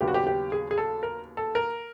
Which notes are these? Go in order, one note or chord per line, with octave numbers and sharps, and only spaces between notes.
D#2 C#3 F#3 B3 D4 G4
F#4
G4
G4
G#4
G#4
A4
A#4
A4
A#4